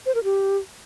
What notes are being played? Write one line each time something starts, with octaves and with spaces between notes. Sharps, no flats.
C5
A#4
G4